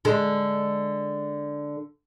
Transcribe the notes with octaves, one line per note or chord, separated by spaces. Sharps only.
D3 G#3